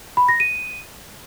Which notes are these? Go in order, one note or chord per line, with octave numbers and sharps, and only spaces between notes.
B5
A#6
D#7